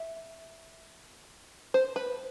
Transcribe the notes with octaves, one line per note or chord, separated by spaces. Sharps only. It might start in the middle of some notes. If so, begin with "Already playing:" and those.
Already playing: E5
C5
B4